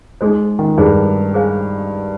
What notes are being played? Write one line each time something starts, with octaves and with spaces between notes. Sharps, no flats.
G#3 D#4 G#4 C5
D#3
G2 D#4 G#4 C5
G#4 C5 F5 G#5